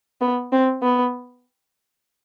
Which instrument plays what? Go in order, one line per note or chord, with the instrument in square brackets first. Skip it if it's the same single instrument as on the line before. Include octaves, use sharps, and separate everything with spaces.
[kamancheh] B3
C4
B3